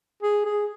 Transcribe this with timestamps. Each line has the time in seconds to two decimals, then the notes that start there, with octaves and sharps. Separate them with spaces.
0.23 G#4
0.45 G#4